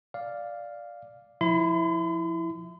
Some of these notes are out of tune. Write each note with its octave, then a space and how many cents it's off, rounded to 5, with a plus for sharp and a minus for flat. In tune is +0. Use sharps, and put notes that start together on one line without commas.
D5 +0 F5 +0
F3 +0 E4 -5 C6 -45